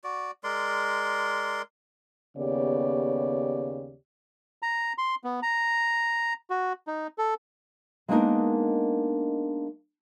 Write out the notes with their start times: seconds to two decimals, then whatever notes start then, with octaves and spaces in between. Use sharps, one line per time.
0.04 F#4 D5
0.44 G#3 A#4 D5 C6
2.37 D#2 C#3 B3 G4 C#5 D5
4.62 A#5
4.98 C6
5.24 B3
5.43 A#5
6.50 F#4
6.87 D#4
7.18 A4
8.08 G#3 A#3 B3 D4 D#4 A#4